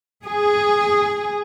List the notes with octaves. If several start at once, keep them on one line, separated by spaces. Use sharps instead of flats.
G#4